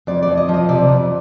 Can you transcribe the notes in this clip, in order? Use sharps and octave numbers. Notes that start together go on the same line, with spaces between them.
F2 D5
D5
F2
D#5
F3 D#5
C3 D5
F2